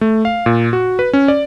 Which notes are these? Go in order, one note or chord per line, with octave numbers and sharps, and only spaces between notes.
A3
F5
A#2
F#4
B4
C#4
D5